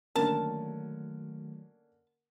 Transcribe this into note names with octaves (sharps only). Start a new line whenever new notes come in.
D3 D#3 F#3 A3 A#3 C#4 A#4 A5